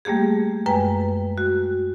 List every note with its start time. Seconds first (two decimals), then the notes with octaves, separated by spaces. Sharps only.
0.05 G3 A3 A#3 G4 G#4
0.66 F#2 G#3 B4 G5
1.38 F#4